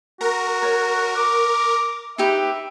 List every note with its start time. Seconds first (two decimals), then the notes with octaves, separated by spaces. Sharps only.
0.21 F#4 A#4 A#5
0.62 C#5
1.16 D6
2.18 D#4 G4 B4 E5